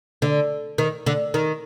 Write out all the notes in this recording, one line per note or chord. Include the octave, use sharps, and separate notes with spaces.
D3
D#3
D3
D#3